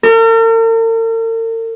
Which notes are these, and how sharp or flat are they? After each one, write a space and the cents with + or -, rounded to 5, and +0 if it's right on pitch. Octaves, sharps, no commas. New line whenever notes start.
A#4 -45